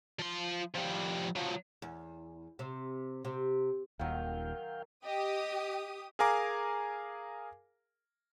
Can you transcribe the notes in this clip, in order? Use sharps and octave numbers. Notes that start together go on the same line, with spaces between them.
F3 C6
F3 G3
F3 F#3
E2
C3
C3
D#1 D#2 D#3 F#3 F5 G5
G4 D#5 D#6
G#4 A#4 F5 G#5 A#5 D6